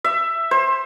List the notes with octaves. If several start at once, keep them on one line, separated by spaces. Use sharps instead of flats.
E5
C5